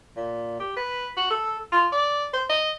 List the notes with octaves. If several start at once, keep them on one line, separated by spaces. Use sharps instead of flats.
A#2
G4
B4
F#4
A4
F4
D5
C5
D#5